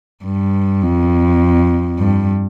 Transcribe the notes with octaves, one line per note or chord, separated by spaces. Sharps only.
G2
F2
G2